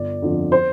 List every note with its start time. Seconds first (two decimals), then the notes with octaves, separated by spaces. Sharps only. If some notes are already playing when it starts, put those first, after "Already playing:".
Already playing: G1 D5
0.22 F2 D3 F3
0.52 C5